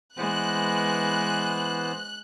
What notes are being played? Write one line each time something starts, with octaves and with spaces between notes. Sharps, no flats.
E3 G#3 B3 C5 F#6